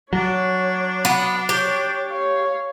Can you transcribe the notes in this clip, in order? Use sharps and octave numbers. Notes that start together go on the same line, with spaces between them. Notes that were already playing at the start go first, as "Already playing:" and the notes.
F#3 D4 C#5
B3
G4 C#5
C#5 F5